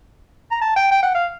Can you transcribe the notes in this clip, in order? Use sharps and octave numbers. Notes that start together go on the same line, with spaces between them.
A#5
A5
G5
G5
F#5
F5